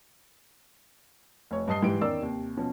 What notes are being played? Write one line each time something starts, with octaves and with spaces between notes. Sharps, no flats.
F1 C#5
G2 D#5 A5 D#6 C7 G7
G#2 E3 G3 D#5 D7
E2 D#3 C#4 A#4 D5 E6
D#2 C3
B2 F3 C#4